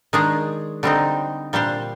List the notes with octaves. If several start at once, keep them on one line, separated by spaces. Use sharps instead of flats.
D#3 G#3 D4 G#4
D3 G3 C4 D#4
A#2 G3 D4 G4 C5